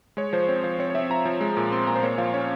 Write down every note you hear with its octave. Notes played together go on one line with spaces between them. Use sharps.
G#3 C#5
F3 C5
C4 C#5
F3 C5
C4 C#5
C#5
C4 E5
F3 A#5
F3
G#3
A#2
C4 C6
A#2 A#5
C5
A#3 C#5
F3 F5
C#4 C#5